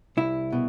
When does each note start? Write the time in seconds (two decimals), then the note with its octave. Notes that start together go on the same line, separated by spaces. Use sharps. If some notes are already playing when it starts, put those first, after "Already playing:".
0.17 C2 E4
0.53 B2